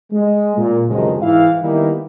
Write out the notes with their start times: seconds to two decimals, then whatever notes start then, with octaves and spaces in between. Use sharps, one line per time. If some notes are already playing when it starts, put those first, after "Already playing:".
0.12 G#3
0.58 A#2
0.88 C#2 F#2 C3 D#3 F3 G#3
1.21 G#2 E3 E4 F5
1.62 D#3 G3 A#3 B3 D#4 E4